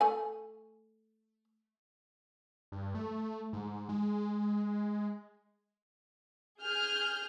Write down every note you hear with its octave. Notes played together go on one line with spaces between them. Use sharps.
A3 G#5
G2
A3
G#2
G#3
G#4 F6 G6